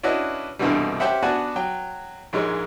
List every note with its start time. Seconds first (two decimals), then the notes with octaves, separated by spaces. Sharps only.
0.03 C#4 D4 E4 F#4 B4 D#5
0.59 C2 G2 B2 D3 E3 G3
1.00 C#4 G4 C5 E5 F#5
1.23 B3 D4 F#4 G#5 A5
1.56 F#3 G5
2.33 A#1 G#2 G#3 C#5